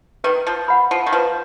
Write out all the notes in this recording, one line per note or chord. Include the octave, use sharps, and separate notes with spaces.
D#3 B4
F3
F#5 B5
F3
D#3
F3 B4